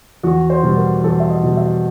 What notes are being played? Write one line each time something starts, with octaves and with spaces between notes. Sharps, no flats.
E2 F#4
C5
B2 G3
A#4
E2 A4
E5
D#5
B2 G3
E5